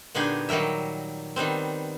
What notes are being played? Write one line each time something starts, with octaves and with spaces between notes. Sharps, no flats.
A#2 D3 B3 D#4 G4 G#4
D#3 F#3 G3 A#4 E5
D#3 G3 B3 C4